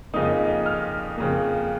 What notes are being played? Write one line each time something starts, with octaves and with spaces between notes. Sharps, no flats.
F2 C#3 A#3 D#4 D#6
F6
F2 C#3 A#3